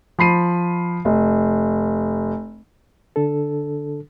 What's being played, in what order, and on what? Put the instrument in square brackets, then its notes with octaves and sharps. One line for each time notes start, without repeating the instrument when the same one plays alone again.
[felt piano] F3 B5 C7 D#7
F1
[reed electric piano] D3 D4 A4